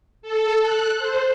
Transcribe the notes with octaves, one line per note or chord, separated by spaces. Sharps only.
A4
F#6
C5